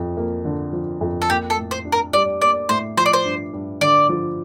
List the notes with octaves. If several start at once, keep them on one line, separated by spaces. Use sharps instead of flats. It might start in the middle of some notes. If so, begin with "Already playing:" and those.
Already playing: F2 F3
A#3
D3
F3
F2
A4
A#3 G4
A4
A2
C5
D4
A#4
G3 D5
A#3 D5
A2 C5
F3 C5
D5
C5
G2
G2
D3 D5
F3